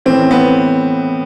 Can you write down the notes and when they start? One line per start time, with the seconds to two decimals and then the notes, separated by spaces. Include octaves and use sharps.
0.06 A2 E3 C4
0.31 B3